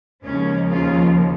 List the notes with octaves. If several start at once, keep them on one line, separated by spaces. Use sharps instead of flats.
D#2 C#3 F3 G#3 C#4
C#4 F4